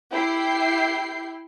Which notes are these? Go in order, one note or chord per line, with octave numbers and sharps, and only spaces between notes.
E4 G4 G5 C7